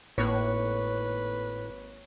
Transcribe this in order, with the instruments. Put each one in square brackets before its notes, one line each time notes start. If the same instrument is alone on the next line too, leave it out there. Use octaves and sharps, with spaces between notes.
[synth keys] G#1 A#3 F#6 [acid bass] A2 [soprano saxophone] B4 [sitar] C#5